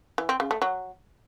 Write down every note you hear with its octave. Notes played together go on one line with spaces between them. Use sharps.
E3
C4
C#3
A3
F#3